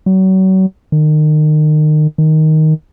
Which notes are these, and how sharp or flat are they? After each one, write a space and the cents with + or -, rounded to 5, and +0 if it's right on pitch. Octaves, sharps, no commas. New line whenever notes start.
F#3 +35
D#3 -30
D#3 +5